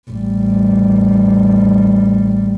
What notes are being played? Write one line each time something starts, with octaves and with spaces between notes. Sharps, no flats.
A1 G3